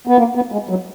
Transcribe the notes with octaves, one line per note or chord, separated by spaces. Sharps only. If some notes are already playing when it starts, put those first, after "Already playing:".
B3
A#3
B3
G#3
F#3